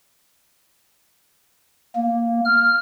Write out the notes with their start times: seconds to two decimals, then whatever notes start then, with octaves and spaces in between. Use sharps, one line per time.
1.96 A#3
2.45 F6